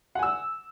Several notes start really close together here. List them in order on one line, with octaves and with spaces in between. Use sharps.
F#5 G#5 E6